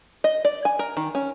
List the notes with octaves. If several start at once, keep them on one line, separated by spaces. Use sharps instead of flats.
D#5
D5
G#5
A#4
D#3
C#4